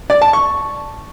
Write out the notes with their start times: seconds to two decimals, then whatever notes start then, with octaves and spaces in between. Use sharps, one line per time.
0.10 D5
0.21 A5
0.33 C#6